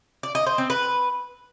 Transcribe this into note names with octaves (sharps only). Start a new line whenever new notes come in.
D5
D#5
C5
C4
B4